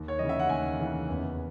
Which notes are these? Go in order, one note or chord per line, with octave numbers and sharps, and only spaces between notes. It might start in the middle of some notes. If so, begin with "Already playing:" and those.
Already playing: D#2
C#5
C#3 E3 D#5
E5
F#5
D#2 G#5
C#3 E3
E2